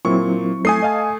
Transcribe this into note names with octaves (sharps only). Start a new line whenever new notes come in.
A#2 F#3 C4 E4 C#6
A3 G#5 D#6 C7
D#5 F5 A5